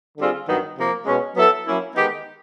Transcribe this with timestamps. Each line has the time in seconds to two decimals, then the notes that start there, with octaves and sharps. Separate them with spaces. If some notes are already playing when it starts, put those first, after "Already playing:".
0.18 D3 G3 C4 F4 G#4
0.47 G2 D#3 F#3 B3 D#4
0.76 C3 F3 A#3
1.06 B2 G#3 C#4
1.35 F#3 B3 E4 A4
1.66 F#3 A#3 C#4 E4
1.95 D#3 G#3 B3 D#4 G4